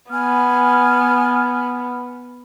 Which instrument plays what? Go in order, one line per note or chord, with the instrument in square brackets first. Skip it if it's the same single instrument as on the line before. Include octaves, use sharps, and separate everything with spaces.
[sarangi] B3 [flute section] G#5 F6